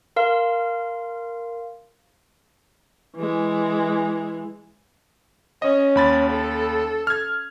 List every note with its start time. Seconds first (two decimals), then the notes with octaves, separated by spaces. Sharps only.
0.16 A#4 F5 C6
3.16 E3 G#3
5.62 C#4 D#5
5.95 D#2 B5 A6
6.30 A4
7.07 F6 G#6